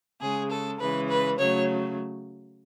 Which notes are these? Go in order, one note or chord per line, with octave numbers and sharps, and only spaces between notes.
C#3 G#3 G#4
A4
C#3 E3 G#3 B4
B4
C#3 F#3 A3 C#5